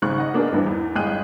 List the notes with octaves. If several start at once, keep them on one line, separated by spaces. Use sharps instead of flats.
G#1 G#2 C#3 C#6 F#6
D#5 F#5
A#3 B3 D4 D#4 G#4 A#4
G#1 G2 D3 E3
E2
G1 G#3 G#4 G5 F#6 D#7